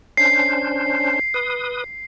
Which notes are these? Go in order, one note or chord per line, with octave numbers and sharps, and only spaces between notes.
C#4 D4 C5 C7
B4 D#6